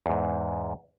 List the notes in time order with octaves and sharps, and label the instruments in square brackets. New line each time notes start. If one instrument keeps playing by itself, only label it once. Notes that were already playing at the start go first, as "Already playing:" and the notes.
[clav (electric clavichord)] E2 G#2